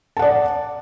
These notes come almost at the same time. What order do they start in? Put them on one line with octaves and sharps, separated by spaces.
A5 F#5 D5